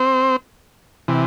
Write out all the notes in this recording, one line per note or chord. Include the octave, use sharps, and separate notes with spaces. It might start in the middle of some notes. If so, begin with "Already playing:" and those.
Already playing: C4 C5
C3 E3